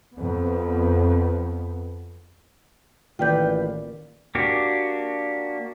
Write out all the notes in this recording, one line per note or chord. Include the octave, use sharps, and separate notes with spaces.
F2 B3
A1 D#3 A#3 F4 B4 D5 G5 G6
A#3 D4 F#4 G4